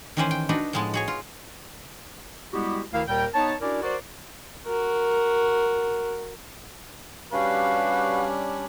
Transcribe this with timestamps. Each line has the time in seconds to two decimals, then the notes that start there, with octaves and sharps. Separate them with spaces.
0.17 D#3 E3 C#4 G4 B4 C5
0.31 G5
0.49 D4 D#4 F#4 B4
0.73 A2 F3 G#3 B3 A5
0.94 F#4 G#4 C#5
1.08 F4
2.53 G3 G#3 B3 E4 F#4 G4
2.93 D2 D#3 E4 A#4 F5
3.08 D#2 A#2 G3 A#4 G5
3.34 B3 D#4 C#5 A5
3.61 C#4 D4 E4 F#4 A#4 D5
3.83 F#4 A#4 C5 D5
4.66 F#4 A#4
7.33 G3 C#4 D4 F#4 G4 B4 F5